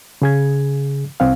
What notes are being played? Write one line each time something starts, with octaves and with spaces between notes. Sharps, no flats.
C#3 G#4 G#6
C2 C4 F5